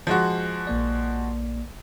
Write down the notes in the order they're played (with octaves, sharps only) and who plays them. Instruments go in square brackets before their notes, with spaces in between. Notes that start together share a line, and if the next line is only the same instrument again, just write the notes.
[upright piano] F3 G#3 F#4
[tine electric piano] A#1 A#3 D5